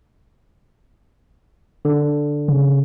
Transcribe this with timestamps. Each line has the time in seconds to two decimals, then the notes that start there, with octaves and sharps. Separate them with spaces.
1.85 D3
2.48 C#3